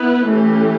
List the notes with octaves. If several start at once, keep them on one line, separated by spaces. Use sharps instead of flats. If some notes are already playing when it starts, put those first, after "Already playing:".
Already playing: B3 E4 B4
E3 A3 C#4 G4